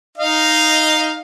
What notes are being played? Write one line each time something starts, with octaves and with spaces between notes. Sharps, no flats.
D#4 D#5 F5